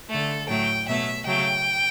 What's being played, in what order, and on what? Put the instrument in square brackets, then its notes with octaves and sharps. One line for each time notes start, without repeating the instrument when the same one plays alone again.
[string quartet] D3 A3 A4
A2 F#3 A3 G5
B2 F#3 A3 E5
C#3 F#3 A3 G5